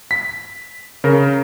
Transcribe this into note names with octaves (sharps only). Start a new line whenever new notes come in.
B6
C#3 A#4